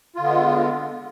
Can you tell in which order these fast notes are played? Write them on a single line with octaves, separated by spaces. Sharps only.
F4 D3 B3 G#3